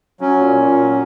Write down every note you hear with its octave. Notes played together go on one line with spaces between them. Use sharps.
F#3 C#4
A#2
A#2
F#3